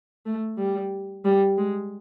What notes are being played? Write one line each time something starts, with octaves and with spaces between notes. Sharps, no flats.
A3
G3
G3
G#3